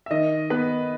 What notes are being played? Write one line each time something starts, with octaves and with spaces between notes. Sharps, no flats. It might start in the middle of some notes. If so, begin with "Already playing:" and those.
E5
D#3 D#5
B3 B4